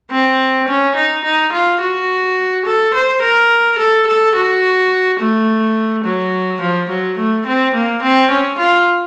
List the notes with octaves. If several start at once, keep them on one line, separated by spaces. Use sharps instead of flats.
C4
C#4
D#4
D#4
F4
F#4
A4
C5
A#4
A4
A4
F#4
A3
F#3
F3
F#3
A3
C4
A#3
C4
C#4
F4